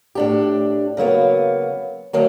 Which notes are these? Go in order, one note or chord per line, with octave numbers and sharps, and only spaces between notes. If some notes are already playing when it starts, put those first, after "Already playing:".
A2 D4 G4
C#3 F#3 A#3 B3
D2 D#3 F#3 A#3